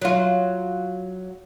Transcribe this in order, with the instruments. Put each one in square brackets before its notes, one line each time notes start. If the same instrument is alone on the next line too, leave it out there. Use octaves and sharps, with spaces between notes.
[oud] F#3 F4